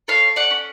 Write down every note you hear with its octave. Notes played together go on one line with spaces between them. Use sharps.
A4 C#5 F5
D5 F#5
C#4